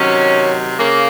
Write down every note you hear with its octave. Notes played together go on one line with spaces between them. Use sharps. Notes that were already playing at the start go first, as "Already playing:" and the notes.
Already playing: C3 D#3 F#3 C#4
C#3 A#3